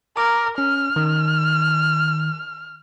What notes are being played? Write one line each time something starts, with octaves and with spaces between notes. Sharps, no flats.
A#4 D6
C#4 F6
D#3